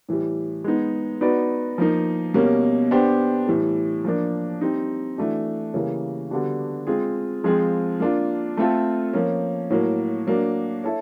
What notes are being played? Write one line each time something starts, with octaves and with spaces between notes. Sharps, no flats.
A2 E3 G3
G#3 B3 D#4
B3 D#4 F#4 B4 D5
F3 A#3 D#4
B2 G3 A#3 C#4
B3 D4 G4 C5
A2 E3 G3
F3 A#3 D4
G3 C4 D#4
E3 A3 D4 F#4
C#3 E3 G3 A#3
D3 G3 B3 D4 F#4
G#3 C4 F4 G#4
F3 G#3 C4 F4 G#4
A#3 D4 F4
A3 C4 F4 A4
F3 A#3 C#4
A2 F#3 A#3
F#3 A#3 D4
E4 A4 C#5